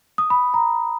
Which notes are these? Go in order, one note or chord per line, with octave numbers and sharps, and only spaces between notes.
D#6
B5
A#5